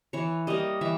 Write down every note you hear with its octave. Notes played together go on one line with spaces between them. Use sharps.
E3 C#5
G3 A#3 D#5
E3 E5